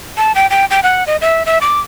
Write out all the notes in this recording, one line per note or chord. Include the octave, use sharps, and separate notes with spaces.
A5
G5
G5
G5
F#5
D#5
E5
E5
D6